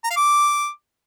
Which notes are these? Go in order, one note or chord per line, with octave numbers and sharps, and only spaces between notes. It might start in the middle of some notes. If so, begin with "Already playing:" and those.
A#5
F5
D6